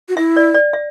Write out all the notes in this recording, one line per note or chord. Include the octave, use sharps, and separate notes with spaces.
F#4
E4 E5
D5
D5
E5